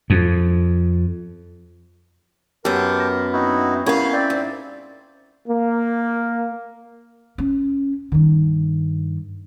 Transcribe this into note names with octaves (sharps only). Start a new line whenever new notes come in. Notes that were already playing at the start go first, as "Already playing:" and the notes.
F2
F#2 B3 G4 A#4 G5 A5 D6
A#6
C4 D#4 E4 F#4
B3 C#4 E4 A#4 C#5 F5 G#5 B5
C4 D5 E5 G5
G#2
A#3
C#4
G2 D#3